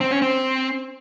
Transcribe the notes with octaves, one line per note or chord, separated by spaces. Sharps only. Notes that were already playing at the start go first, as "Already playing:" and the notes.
C4
C#4
C4